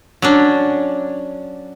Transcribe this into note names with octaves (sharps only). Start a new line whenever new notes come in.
F#3 C#4 D4